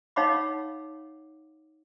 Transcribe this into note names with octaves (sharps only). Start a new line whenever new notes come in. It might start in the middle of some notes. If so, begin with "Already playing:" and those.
D#4 C#5 F5 F#5 B5 D6